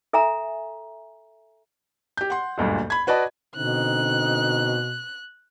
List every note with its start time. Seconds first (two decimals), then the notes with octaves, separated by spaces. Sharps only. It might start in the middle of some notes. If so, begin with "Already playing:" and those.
0.13 A4 E5 G#5 A#5
2.17 G4 G6
2.30 F#5 C6
2.58 F#1 D2 G2 A#2
2.90 B5 G#6
3.07 F#4 B4 D5 D#5 A5
3.56 B2 D3 C4 D#4 F#6